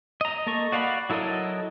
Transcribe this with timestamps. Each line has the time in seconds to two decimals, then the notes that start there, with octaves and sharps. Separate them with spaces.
0.21 D#5 A#5
0.47 A#3 A4 D#5 C#6
0.72 F#4 D5 F5 F#5 B5
1.10 F#3 E4 A4 A#4 D#5